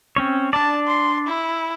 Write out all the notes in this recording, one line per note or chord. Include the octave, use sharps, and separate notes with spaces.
C4 C#4 C#5
D4 D5 A5
C6
E4